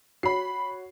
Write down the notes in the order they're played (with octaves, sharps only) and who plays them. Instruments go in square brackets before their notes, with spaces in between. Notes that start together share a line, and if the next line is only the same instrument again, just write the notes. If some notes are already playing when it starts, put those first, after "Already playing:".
[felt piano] F#4 C#5 [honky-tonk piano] B5 C7